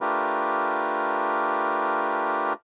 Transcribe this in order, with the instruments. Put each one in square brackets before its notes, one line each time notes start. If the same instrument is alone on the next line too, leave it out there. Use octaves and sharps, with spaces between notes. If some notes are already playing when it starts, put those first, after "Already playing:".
[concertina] A3 D4 F4 G4 A#4 B4